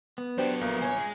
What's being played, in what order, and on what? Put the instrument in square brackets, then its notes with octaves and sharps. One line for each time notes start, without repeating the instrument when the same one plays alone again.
[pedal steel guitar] B3
[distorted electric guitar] F#3 A4 [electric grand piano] D4 G4 [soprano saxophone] C5
[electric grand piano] A#1 [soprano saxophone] A#3
[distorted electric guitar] C5 C#5 [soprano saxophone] G#5
[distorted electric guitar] G#3